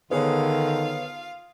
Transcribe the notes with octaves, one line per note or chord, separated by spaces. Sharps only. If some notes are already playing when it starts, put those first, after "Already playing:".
D3 D#3 B3 F4 G#4 C#5 F5